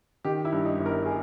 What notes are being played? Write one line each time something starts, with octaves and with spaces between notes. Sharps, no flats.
D#3 G4
E4
G2
D#4
G1
A#4
G#4